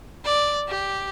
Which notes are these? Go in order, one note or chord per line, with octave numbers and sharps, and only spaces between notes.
D5
G4